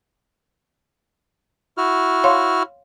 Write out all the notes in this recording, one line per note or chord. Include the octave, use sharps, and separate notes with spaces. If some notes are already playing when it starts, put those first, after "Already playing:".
E4 F#4 F6
C#5 F5 C6